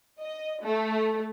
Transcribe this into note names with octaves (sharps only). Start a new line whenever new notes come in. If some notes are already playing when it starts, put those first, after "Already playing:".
D#5
A3